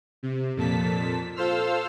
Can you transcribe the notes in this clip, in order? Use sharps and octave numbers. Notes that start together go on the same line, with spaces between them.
C3
F2 A#2 A5 B6
F4 A4 C5 E6 F6